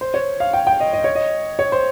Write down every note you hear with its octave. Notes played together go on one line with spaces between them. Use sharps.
C5
C#5
F5
G5
G5
D#5
D#5
C#5
D#5
C#5
C5